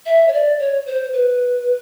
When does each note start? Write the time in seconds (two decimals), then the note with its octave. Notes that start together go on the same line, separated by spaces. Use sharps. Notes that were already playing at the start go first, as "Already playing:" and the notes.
0.06 E5
0.28 C#5
0.33 D5
0.59 C#5
0.86 C5
1.14 B4